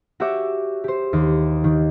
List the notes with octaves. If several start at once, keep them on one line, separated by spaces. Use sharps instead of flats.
F#4 G4 C#5 E5 D6
G4 C5
D#2
D#3